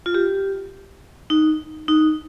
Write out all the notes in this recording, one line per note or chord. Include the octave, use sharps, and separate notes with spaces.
F4
G4
D#4
D#4